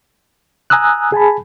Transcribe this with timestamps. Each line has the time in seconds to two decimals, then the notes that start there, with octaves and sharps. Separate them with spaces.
0.70 G#5 A#5 D#6 E6 F#6
1.12 G#4 G#5 A5 B5